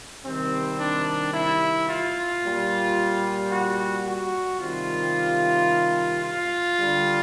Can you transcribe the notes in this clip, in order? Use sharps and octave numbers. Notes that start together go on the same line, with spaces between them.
C3 D#3 G3 C4
D4
E4
F4
A#2 G3
F#4
F#4
C3 D#3 G3 F4
F4
D3 G3